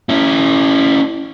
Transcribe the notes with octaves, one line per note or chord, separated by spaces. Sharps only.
C#4 E4